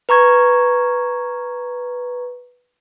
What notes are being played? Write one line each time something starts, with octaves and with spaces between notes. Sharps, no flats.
B4 A#5 C#6 G#6